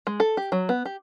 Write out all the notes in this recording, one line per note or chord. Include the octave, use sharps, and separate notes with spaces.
G#3
A4
G4
F#3
B3
G4